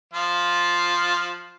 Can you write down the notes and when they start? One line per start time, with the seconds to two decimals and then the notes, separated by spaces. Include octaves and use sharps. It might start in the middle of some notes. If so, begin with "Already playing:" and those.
0.14 F3 F4